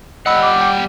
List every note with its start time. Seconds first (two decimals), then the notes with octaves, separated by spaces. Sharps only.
0.26 G3 D#5 F#5 B5 E6
0.42 D6
0.61 G5